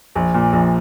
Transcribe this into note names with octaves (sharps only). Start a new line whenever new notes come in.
A#1
A#2
A#1